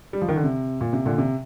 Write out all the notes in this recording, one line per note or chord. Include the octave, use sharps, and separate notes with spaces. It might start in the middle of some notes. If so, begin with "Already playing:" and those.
G3
F3
D#3
D3
C3
A#2
C3
A#2 D3
C3